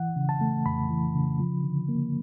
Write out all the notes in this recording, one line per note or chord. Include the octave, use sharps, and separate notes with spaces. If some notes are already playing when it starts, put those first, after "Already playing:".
Already playing: E3 F#5
C#3
A5
A3
F2 B5
E3
C#3
F3
D3
A#3